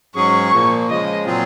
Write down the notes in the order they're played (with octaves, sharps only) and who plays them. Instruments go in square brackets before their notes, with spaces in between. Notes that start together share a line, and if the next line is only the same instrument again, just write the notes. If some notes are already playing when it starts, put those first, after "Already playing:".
[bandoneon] G#2 F#3 C#4 G#4 [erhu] C#6
[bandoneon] A#2 F3 A#3
[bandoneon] C#3 F3 G#3 [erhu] D#5
[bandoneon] A#2 F#3 C4 F4 G#4